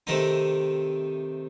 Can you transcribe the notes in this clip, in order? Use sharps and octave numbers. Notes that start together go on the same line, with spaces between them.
C3 D#3 A3 D#4